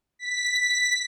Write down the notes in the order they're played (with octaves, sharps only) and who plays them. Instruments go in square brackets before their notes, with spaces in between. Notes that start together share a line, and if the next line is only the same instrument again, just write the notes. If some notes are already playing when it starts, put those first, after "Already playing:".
[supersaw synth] B6